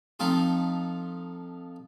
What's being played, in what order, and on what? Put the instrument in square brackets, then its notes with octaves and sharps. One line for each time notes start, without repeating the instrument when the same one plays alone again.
[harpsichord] F3 A3 C4 D#4 F4